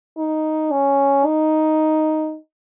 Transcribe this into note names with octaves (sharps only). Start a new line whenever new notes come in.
D#4
C#4
D#4